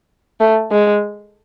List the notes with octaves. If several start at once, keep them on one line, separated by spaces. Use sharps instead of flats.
A3
G#3